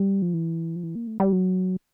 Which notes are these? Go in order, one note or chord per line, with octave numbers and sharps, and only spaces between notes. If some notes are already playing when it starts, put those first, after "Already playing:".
Already playing: G3
F3
E3
F3
E3
A#3
A3
G3
F#3